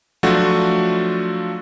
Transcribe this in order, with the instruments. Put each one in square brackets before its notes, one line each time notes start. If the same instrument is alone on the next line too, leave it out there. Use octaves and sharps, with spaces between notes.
[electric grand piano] F3 F#3 A3 D4 F4 F#4